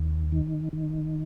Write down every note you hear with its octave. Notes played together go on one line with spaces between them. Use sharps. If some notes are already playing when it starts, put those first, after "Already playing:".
Already playing: D#2
D#3
D#3